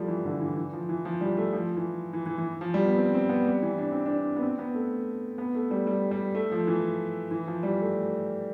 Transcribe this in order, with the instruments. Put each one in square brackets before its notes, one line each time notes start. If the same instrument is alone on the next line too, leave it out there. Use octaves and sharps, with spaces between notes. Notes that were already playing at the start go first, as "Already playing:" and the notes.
Already playing: [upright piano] F3 G3 A3
E3
D3
E3
E3
F3
E3
F3
G3
A3
F3
E3
E3
E3
E3
F3
G3
B3
C4
C4
B3
G3
E3
D4
C4
D4
B3
C4
B3
A3
B3
A3
G3
G3
G3
A3
F3
E3
E3
F3
G3
A3